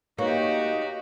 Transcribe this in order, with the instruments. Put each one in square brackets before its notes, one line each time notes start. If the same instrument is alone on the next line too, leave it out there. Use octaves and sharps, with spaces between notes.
[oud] A#3 [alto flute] D#4 [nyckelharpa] F#4 G4 [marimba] B4 C#5 C#6